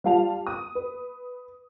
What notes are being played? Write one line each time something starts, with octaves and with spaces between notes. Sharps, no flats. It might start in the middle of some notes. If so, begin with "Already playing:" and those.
G3 F4 F5 A5 F7
D#6
B4